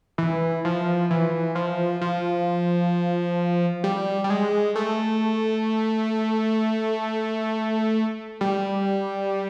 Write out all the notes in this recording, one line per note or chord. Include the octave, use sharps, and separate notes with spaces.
E3
F3
E3
F3
F3
G3
G3
G#3
A3
G3